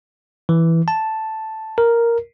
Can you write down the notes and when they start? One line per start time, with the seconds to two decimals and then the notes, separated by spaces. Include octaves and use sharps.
0.49 E3
0.88 A5
1.78 A#4